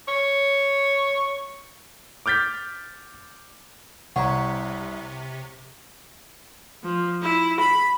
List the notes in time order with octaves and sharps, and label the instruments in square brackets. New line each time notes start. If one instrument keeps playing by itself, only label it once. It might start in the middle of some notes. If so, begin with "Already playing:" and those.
[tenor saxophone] C#5
[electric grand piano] D6 F6 G6 A6 B6
[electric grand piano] C2 [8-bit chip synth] C3 [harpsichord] C#5 [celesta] F#5 A#5
[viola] F3
E4
B5